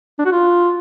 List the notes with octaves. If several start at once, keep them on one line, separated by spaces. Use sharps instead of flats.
D4
F#4
F4